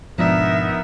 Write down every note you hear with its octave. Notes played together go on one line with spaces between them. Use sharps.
G#2 B2 F3 B3 D4 D#4 A#4 E5